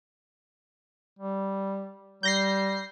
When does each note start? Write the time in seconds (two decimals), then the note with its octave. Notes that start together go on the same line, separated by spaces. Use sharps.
1.19 G3
2.23 G3 G6 A#6 C7